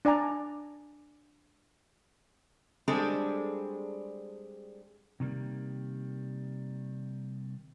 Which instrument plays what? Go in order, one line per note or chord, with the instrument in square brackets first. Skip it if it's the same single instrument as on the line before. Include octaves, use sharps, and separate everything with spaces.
[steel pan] D4 D5 G#5 A#5
[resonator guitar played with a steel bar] G3 G#3 C4 D4 G#4 A4
[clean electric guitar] C3 D#3 G3 A#3